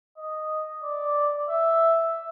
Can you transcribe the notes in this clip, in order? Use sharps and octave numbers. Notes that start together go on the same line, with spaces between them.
D#5
D5
E5